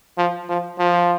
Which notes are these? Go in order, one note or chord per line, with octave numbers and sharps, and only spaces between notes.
F3
F3
F3